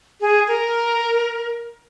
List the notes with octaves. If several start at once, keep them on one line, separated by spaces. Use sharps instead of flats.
G#4
A#4